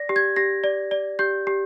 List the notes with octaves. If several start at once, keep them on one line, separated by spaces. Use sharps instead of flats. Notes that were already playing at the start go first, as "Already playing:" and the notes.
Already playing: D5 A#6
G4
G#6
G4 A#6
D5
D5
G4 G6
G4